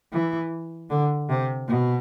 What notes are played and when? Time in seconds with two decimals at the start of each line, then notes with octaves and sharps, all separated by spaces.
0.13 E3
0.90 D3
1.29 C3
1.68 B2